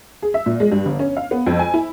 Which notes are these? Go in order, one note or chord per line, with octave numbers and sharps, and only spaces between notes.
G#4
E5
A#2
G#3
G2
G1
C#4
F5
B3
F2
G#5
E4